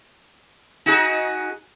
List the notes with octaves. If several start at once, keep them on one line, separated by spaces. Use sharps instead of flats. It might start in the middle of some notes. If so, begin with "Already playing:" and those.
D#4 F#4 G#4